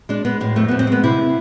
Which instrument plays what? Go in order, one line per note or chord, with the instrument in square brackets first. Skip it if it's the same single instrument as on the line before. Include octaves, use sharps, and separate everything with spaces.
[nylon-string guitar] G#3 D4
G#3 B3
A2 G#3
F2 A3
F2 B3
C4
G#3 B3
C3 E4